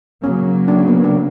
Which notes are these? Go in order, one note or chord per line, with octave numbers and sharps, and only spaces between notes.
C#3 F#3 A#3 C#4
D4
C#4
B3
D4